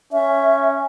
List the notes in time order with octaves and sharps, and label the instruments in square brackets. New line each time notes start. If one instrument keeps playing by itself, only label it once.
[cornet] C#4 [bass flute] E5